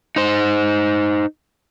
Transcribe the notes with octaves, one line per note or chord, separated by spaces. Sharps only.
D#4 C5